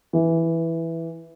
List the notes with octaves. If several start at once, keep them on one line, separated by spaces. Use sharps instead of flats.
E3